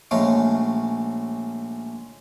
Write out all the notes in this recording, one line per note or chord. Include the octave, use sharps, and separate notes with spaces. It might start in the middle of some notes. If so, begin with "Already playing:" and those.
A#1 G#3 A3 C#4 F5